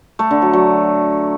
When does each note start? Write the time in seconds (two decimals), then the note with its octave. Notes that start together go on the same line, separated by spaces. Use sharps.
0.19 A3
0.31 D3
0.42 F#3
0.53 F#3